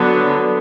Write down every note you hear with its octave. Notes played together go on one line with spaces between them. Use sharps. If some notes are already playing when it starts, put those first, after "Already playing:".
Already playing: D3 F#3 B3 D4